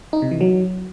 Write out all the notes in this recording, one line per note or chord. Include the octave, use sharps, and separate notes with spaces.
D#4
C3
E3
F#3